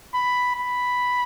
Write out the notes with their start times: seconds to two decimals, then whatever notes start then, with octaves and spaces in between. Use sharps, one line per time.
0.14 B5
0.56 B5